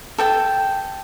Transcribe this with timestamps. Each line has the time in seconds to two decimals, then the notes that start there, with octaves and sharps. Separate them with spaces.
0.18 A4 G5 A5